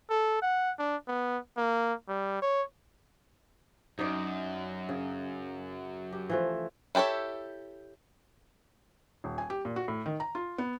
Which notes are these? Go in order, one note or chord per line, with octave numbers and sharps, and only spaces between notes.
A4
F#5
D4
B3
A#3
G3
C#5
F#2 D#4 D5
C#3
G4
E3 F3 A3
E4 G4 A4 C#5 E5
D#1
G#5
G4
A#2
F#4
A2
D#3
A#5
F4
B3